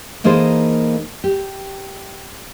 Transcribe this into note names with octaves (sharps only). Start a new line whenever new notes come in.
E3 A#3 D#4 G#4 A4 C5
G4